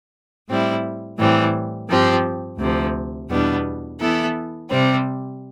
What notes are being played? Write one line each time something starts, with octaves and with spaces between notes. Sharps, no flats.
A2 G3 C4 E4
A2 E3 G3 C4
G2 F3 C4 G4
D2 C3 F3
E2 B2 G3 B3 D4
E3 B3 E4 A4
C3 G3 C4